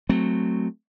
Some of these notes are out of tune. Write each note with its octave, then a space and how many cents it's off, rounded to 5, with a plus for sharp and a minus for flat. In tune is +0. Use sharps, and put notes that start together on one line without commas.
F#3 -5 A3 +0 C4 +0